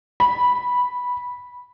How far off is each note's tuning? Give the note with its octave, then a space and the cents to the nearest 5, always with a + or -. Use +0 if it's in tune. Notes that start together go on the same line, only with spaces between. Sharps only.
B5 -5